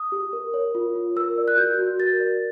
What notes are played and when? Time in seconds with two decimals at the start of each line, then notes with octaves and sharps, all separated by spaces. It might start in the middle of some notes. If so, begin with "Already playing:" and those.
Already playing: D#6
0.12 G4
0.33 A#4
0.54 C#5
0.75 F4
0.95 F4
1.16 A#4 E6
1.38 D5
1.48 F#6
1.57 F#4 G6
1.79 F#4
1.99 A#4 A6
2.20 D5